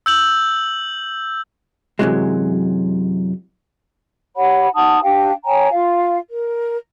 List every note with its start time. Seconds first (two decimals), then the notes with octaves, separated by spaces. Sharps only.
0.06 E6 G6 F#7
1.99 F#2 A2 C3 E3 F#3 G#3
4.35 G4 C#5 F#5 B5
4.74 D#4 F#5 A5 D#6
5.02 D4 G4 F5 G5
5.44 C#5 G5 G#5 A#5
5.71 F4 F5
6.29 A#4